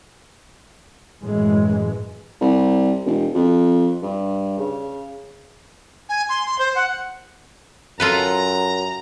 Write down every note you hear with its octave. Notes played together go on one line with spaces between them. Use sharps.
F#2 A2 E3 G#3
C2
E1
F2
G2
C#3
G#5
C6
C6
C5
F#5
F#2 F4 A4 B4 A#5